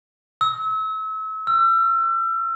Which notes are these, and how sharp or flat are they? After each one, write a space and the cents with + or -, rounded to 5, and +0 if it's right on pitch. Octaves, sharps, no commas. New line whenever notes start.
E6 -35
E6 +40